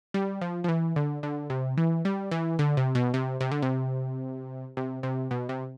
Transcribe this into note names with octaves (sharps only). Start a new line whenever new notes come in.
G3
F3
F3
E3
D3
D3
C3
E3
G3
E3
D3
C3
B2
C3
C3
D3
C3
C3
C3
B2
C3